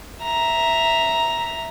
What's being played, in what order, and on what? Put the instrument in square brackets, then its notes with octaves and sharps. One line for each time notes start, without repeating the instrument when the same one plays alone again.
[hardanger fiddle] E5 A#5